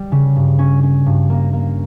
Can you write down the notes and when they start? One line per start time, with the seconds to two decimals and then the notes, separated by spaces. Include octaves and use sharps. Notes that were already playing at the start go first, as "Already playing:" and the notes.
Already playing: G3
0.12 C#3
0.36 G2
0.59 C#4
0.83 C#4
1.06 G2
1.30 A#3
1.53 A#3